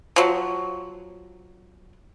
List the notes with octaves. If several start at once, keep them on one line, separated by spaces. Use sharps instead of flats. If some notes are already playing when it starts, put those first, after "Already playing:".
F3 F#3